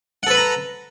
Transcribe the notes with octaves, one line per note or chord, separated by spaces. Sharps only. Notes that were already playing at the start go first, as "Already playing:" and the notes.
A4 B4 F#5 A#5 B5